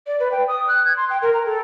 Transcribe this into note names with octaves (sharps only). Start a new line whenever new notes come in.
D5
B4
G5
D#6
F#6
G#6
C6
G5
A#4
A#5
A4